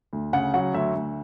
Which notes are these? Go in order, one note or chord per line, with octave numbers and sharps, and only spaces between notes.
D2
C#3 F#5
F#3 F#5
D2 E5
D2